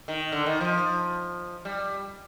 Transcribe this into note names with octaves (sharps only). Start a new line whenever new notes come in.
D#3
D3
D#3
F3
G3